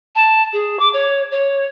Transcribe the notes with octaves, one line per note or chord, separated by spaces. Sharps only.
A5
G#4
D6
C#5
C#5